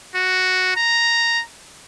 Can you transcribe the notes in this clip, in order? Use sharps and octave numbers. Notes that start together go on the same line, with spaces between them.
F#4
A#5